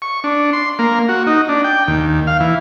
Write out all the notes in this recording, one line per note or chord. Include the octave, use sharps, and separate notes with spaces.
C#6
D4
C6
A#3
F#4
D#4
D4
G5
D#2
F5
E3